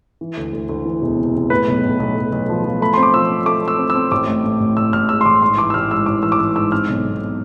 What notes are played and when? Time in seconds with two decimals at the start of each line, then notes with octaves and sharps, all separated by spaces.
0.21 E3
0.37 D2
0.53 D2
0.69 D2
0.85 E3
1.02 E1
1.18 C3
1.34 C3
1.50 A2 B4
1.68 B1
1.83 A2
1.99 B1
2.17 B1
2.32 B1
2.49 F3
2.64 F3
2.81 A3 B5
2.94 C4 C6
3.03 D6
3.13 F3 E6
3.29 C4
3.46 A3 D6
3.63 A3 E6
3.78 C4
3.90 E6
3.95 C4
4.11 A1 D6
4.28 A2
4.44 A2
4.60 A1
4.77 A1 E6
4.93 A1 F6
5.09 G#3 E6
5.21 C6
5.26 A1 D6
5.42 G#2 C6
5.57 E3 D6
5.70 E6
5.74 A1 F6
5.91 G#2 E6
6.06 A1 D6
6.23 E3 E6
6.32 D6
6.39 E3 E6
6.56 G#2 E6
6.72 C4 F6
6.88 B1
7.05 B2